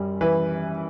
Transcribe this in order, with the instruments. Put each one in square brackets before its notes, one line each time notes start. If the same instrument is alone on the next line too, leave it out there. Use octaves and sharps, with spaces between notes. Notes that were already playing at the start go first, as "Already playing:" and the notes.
Already playing: [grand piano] F#2 G3
E3 B4